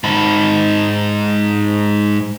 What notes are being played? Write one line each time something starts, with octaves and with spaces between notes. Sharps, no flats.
G#2 B5